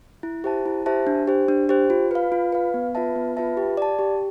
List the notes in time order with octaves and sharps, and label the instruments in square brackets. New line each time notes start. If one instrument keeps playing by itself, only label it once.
[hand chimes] E4
G4 C5 E5 A5
E4
G4 C5 E5 A5
D4
G4 C5
D4
G4 C5
F4
B4 F5
F4
B4 F5
B3
F4 B4 E5 A5
B3
F4 B4 E5 A5
G4
D5 A5
G4